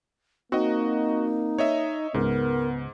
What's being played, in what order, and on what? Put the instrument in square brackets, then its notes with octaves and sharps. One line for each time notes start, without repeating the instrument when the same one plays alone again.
[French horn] A#3 [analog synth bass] C4 [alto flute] D#4 [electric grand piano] F#4 D#5
[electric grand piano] C#5 D#5 E5
[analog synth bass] C#2 [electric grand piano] G#2 [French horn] B3 [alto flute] A#4